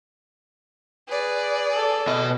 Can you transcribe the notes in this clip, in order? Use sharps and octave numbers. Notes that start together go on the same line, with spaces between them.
G#4 B4 D5
A4
B2 D#5